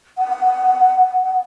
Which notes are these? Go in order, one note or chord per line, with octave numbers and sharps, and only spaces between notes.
F#5